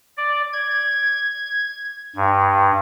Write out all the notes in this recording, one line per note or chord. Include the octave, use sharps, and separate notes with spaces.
D5
G#6
G2